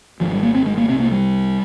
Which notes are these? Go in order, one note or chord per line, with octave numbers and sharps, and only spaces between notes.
G#1 G#2 F3
G3
A#3
C4
G#3
A#3
C2 C3 C4
A#3
G3